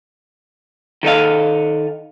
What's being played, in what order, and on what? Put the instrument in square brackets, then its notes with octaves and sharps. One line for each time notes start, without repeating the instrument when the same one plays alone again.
[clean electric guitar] D#3 A4 D#5 F5